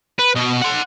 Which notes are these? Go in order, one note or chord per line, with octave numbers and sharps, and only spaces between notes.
B4
B2 D#5
F#5 C6